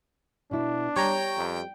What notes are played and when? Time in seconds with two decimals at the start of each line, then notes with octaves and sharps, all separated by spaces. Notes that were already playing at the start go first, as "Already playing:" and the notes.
0.51 B2 D4 E4
0.96 G3 C#5 G5 A#5
1.37 F2